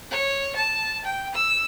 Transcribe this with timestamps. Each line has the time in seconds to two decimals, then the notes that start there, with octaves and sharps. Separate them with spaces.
0.11 C#5
0.55 A5
1.04 G5
1.35 E6